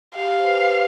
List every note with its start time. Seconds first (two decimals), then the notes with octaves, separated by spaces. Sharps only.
0.16 G4 F5
0.39 C5
0.45 B4